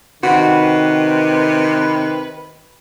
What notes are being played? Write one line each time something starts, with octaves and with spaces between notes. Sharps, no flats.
C3 D#3 F#4 B4